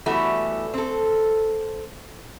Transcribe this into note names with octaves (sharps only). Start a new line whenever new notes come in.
E3 G3 A3 B3 F#4
C4 A4